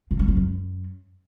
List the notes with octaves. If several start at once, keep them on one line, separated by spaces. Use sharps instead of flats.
A#2
G3
F#3
F#2